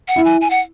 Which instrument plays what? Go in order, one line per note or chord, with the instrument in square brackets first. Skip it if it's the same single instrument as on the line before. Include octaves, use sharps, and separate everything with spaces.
[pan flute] F#5
[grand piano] E4
[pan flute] G#5
G#5
F#5